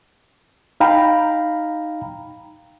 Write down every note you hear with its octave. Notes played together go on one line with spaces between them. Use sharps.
D#4 F5 G5 A#5 B5